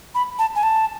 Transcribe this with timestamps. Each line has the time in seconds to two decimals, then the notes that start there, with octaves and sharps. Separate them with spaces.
0.15 B5
0.39 A5
0.55 G#5
0.63 A5